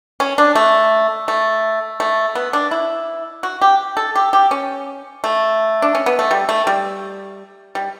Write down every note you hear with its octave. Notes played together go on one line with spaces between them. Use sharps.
C#4
D4
A3
A3
A3
B3
D4
E4
F#4
G4
A4
G4
G4
C#4
A3
D4
C#4
B3
A3
G3
A3
G3
G3